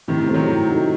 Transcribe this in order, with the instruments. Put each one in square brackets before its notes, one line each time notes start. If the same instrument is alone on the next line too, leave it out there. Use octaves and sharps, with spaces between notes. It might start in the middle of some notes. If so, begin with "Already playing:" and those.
[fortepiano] A2 [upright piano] C3 D#3
[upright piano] C3
[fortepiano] A3 C4
[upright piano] D#3 F#3
[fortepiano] A2
A3 D#4 F#4